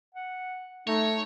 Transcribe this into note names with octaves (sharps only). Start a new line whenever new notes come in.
F#5
A3 D#4 C#5